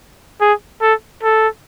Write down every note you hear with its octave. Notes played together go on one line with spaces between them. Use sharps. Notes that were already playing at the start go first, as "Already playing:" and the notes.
G#4
A4
A4